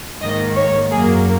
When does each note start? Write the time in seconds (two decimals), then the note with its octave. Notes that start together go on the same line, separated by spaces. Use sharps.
0.21 G#2 D#3 A#3 D#5
0.56 C#5
0.91 F#2 F#3 A#3 G#4